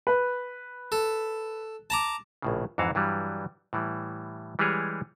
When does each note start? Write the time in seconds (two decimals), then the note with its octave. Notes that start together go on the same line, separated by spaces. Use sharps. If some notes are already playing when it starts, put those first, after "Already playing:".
0.07 B4
0.92 A4
1.90 A5 A#5 D6
2.42 A#1 A2 C#3
2.78 F2 G#2 E3 F#4 F5
2.95 G2 E3 F#3 G3
3.73 A2 E3 G3
4.59 E3 G3 G#3 G4 G#4 C#5